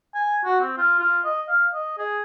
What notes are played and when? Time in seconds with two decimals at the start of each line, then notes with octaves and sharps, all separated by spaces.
0.15 G#5
0.45 F#4
0.61 C4
0.77 F4
0.99 F4
1.24 D#5
1.48 F5
1.74 D#5
1.98 G#4